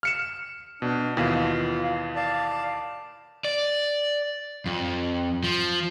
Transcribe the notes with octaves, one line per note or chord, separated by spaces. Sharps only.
F6 C#7 E7
B2 D4
D#2 B2 E3 F4
D5 F5 A5
D5
F2
F3